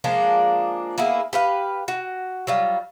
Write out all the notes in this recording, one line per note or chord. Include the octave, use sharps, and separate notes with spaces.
F3 G#3 A#3 D4
A#3 B3 E4 G#4
G4 B4 F5
F#4
F#3 G3 F4